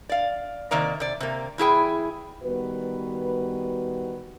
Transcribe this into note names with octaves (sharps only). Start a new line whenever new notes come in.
D5 F5
C3 D#3 A#3 D5 A#5
C3 D5
C3 A#3
E2 E4 G#4 G5
D#3 G3 B3 F#4 B4